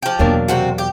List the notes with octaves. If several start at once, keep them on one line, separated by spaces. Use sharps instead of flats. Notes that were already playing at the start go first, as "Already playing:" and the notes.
F3 G4
E2 B2 F#3 A#3 D4
C3 C4 F#4
G4